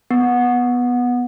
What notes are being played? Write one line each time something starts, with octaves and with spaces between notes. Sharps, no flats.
B3